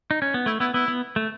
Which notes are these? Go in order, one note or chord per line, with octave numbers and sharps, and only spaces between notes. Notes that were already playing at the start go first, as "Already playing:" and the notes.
D#4
C#4
B3
A3 E4
B3 E4
B3 E4
B3
A3